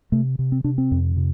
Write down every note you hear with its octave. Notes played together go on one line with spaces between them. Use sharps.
C3 A3
C3
C4
C3 D4
C4
F2
C3